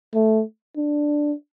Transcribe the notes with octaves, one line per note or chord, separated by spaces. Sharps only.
A3
D4